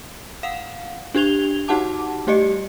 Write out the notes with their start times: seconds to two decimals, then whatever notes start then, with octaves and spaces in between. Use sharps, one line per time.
0.43 F5 F#5
1.14 D4 G4 G#6 F7 G7
1.68 D#4 F#4 G4 F#5 A5 D6
2.27 G3 A3 G4 D5 D#5 C#7